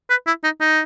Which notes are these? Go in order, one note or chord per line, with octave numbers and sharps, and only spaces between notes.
B4
E4
D#4
D#4